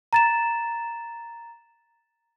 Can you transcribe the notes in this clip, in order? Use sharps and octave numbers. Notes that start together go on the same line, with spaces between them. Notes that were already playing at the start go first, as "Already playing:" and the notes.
A#5 A6 E7